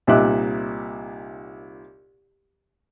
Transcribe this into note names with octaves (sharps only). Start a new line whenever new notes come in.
C2 A#2 D#4 E5 D6 F#6